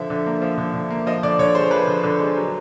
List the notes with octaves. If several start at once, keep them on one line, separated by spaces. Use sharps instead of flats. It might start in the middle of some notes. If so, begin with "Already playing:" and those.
Already playing: D3 F3 E5
D3
A#3
F3
D3
D3
A#3
F3 D#5
D3 D5
D3 C#5
G#3 C5
F3 B4
D3
D3
G#3
F#3